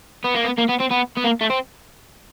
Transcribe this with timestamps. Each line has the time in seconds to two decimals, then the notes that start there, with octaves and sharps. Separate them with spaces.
0.24 B3
0.35 A#3
0.44 B3
0.58 A#3
0.69 B3
0.80 C4
0.90 B3
1.17 B3
1.24 A#3
1.41 A3
1.50 C4